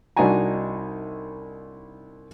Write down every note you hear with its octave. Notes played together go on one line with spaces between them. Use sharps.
C2 D4 D#4 F#4 G#5 A#5